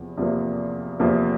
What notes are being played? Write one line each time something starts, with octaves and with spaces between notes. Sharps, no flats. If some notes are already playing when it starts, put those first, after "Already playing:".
Already playing: E2 C3 F3
E2 C3 F3 A#3
E2 C3 F3 A#3